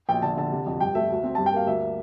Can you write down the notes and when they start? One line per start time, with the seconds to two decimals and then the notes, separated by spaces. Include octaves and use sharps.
0.09 A#1 G5
0.22 D3 A5
0.37 D3 A5
0.52 C3
0.66 F2
0.80 G2 G5
0.95 A3 E5
1.10 D2
1.24 C4
1.35 G2 A5
1.46 G5
1.52 A#3 F5
1.66 D2 E5